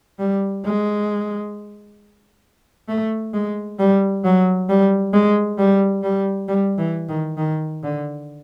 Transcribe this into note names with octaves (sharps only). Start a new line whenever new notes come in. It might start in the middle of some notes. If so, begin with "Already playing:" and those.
G3
G#3
A3
G#3
G3
F#3
G3
G#3
G3
G3
G3
E3
D#3
D#3
D3